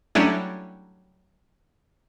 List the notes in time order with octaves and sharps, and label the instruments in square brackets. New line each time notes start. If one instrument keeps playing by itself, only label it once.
[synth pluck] F#3 G3 A3 C#4 D4 E4